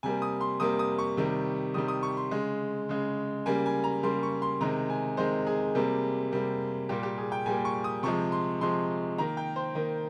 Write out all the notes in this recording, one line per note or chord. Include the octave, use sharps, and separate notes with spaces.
C3 G3 A#3 G#5
D#6
C6
C3 G3 A#3 D#6
D#6
C#6
C3 D#3 G3
C3 D#3 G3 D#6
D#6
C#6
C6
C#3 G#3
C#3 G#3
C#3 G3 A#3 G#5
G#5
A#5
C#3 G3 A#3 C6
C#6
C6
C3 D#3 G#3 A#5
G#5
C3 D#3 G#3 C5
G#4
C3 G3 A#3
C3 G3 A#3
A#2 G3 A#3 G4
G4
G#4
G5
A#2 G3 A#3 G#5
C#6
D#6
C3 F3 G#3 C#6
C6
C3 F3 G#3 C6
D#3 A#3 A#5
G5
C5
D#3 A#3